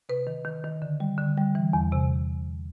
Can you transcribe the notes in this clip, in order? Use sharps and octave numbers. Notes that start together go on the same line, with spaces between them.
C3 B4
D#3
D#3
D#3
D3
G3
D3
G3
E3
E2
C3